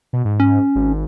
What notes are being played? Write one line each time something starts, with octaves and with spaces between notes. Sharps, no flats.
B2
G#2
C#4
G#1